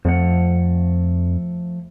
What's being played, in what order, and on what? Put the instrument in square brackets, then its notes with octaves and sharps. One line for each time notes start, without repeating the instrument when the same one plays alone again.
[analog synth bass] F2 [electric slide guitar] F3 A3 F#5